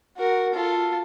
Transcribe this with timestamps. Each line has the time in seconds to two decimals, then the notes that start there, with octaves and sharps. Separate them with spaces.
0.18 F#4 A#4
0.54 F4 A4